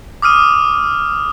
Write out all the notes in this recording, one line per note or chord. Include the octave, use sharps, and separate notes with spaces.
D6 D#6 F6 D#7